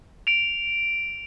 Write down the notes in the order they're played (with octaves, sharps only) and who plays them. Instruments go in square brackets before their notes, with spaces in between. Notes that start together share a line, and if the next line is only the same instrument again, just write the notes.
[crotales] D7 F7